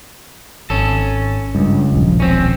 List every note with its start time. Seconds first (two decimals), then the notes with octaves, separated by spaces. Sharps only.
0.70 G#1 C#4 A4
1.55 C#2 G2
1.92 D#1 B1 F3
2.20 C4 C#4